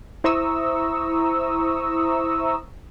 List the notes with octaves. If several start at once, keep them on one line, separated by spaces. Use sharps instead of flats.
E4 C5 A#5 C#6 D#6 E6